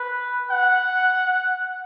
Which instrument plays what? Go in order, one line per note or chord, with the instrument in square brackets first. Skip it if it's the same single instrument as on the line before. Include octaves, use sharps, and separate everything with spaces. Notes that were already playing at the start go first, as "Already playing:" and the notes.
Already playing: [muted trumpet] B4
F#5